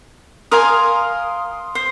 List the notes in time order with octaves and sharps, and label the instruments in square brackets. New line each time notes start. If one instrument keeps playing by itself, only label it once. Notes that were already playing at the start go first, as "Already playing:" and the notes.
[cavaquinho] A#4 F5 G#5 [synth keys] C6 D#6
[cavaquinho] C5